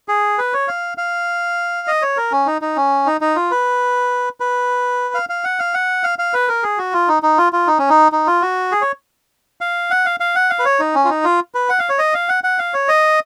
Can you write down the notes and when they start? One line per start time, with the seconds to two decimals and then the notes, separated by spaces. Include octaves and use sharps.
0.08 G#4
0.38 B4
0.53 C#5
0.68 F5
0.98 F5
1.87 D#5
2.02 C#5
2.17 A#4
2.32 C#4
2.47 D#4
2.62 D#4
2.76 C#4
3.06 D#4
3.21 D#4
3.36 F4
3.51 B4
4.40 B4
5.14 F5
5.29 F5
5.44 F#5
5.59 F5
5.74 F#5
6.04 F5
6.19 F5
6.34 B4
6.48 A#4
6.63 G#4
6.78 F#4
6.93 F4
7.08 D#4
7.23 D#4
7.38 F4
7.53 F4
7.67 D#4
7.78 C#4
7.90 D#4
8.12 D#4
8.27 F4
8.42 F#4
8.72 G#4
8.82 C#5
9.61 F5
9.91 F#5
10.06 F5
10.20 F5
10.35 F#5
10.50 F5
10.59 B4
10.65 C#5
10.80 D#4
10.95 C#4
11.05 F4
11.09 D#4
11.24 F4
11.54 B4
11.69 F#5
11.79 F5
11.89 C#5
11.99 D#5
12.14 F5
12.29 F#5
12.44 F#5
12.59 F5
12.74 C#5
12.88 D#5